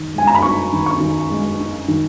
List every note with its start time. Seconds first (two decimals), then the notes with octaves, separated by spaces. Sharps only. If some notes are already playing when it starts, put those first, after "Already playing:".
Already playing: D#3
0.14 G#3 G#5
0.27 A#5
0.35 B5
0.42 D#4 C#6
0.73 D#3
0.86 C#6
1.00 D#3
1.30 G#3
1.59 D#4
1.88 D#3